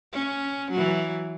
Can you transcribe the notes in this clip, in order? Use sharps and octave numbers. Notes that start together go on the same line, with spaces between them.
C#4
E3 F#3